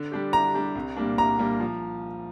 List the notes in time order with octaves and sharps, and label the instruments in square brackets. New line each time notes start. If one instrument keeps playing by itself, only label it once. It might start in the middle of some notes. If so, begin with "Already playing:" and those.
Already playing: [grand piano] D3
G3 D4 G4
[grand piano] D3 [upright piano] A#5
[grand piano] G3 D4 G4
C2
A#2 G3 A#3 D4
[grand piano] C2 [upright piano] A#5
[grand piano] A#2 G3 A#3 D4
F3